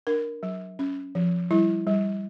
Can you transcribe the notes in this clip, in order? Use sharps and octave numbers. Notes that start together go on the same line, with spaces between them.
D4 A#4
F#3
C#4
F3
G3 E4
G3